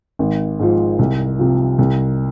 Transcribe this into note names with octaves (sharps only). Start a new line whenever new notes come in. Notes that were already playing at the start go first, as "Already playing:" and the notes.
G#1
G#2 F3
C2
C3 F3
C2